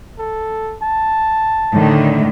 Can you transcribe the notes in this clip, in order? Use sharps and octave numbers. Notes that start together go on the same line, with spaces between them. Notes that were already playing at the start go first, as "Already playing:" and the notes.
A4
A5
A2 D3 D#3